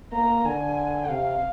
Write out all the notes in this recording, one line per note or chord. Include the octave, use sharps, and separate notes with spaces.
A#3 A#5
D3 G#5
C3 F5